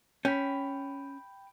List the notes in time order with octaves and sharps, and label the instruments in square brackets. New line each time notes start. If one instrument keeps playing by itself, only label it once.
[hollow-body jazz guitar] C#4 [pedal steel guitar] G5 B5